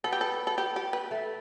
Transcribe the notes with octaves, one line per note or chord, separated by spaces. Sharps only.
B3 A4
G4
A4
A4
G4
G4
B4
A3